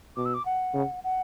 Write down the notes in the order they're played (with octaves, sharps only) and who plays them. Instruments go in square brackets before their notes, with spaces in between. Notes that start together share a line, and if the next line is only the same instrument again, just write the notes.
[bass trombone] B2 [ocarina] D6
[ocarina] E6
D6
F#5
[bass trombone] C#3
[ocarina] F#5